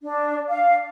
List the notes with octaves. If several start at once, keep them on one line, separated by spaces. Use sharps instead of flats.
D4
F5